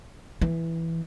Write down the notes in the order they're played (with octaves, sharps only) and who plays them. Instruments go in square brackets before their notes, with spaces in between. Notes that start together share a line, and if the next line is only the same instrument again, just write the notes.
[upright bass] E3